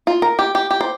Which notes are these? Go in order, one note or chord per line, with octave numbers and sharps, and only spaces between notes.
F4
A#4
G4
G4
G4
C5